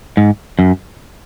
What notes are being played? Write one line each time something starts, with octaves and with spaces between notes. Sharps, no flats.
G#2
F#2